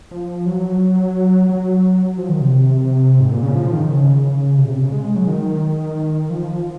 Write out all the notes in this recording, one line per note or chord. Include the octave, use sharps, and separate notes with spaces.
F3
F#3
F#3
F3
D#3
C3
G#2
A#2
C#3
F3
D#3
C#3
C3
A#2
C3
C#3
G#3
G#3
F#3
D#3
F3